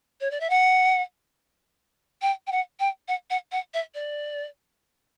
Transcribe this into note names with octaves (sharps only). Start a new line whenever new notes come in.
C#5
D5
E5
F#5
G5
G5
F#5
G5
F#5
F#5
F#5
E5
D5